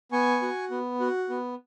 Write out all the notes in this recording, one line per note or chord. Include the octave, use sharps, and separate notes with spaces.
B3 G#5 C#6
F#4
B3
F#4
B3